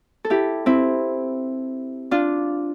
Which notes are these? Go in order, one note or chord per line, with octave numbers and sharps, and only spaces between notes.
A4
E4 G4
C4 E4
D4 F4